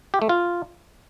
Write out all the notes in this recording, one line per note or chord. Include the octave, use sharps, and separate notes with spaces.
G4
A3
F4